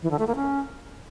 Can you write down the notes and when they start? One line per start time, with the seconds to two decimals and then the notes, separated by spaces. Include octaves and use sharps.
0.03 E3
0.11 D3
0.19 A3
0.27 A#3
0.36 C#4